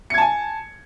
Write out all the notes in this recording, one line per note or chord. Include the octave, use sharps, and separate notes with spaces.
G#5 A5 G#6 C#7